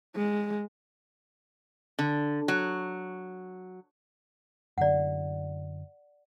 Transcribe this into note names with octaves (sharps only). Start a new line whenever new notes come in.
G#3
D3
F#3
F#2 D3 D5 F#5